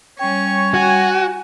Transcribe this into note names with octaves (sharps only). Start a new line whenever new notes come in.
G3 C#4 C#5 G5 C#6
F#4 G#5